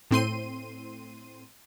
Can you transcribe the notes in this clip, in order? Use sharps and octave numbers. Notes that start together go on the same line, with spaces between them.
A2 C4 C6 D#7